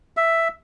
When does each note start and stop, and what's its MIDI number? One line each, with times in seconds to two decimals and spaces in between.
0.17 0.48 76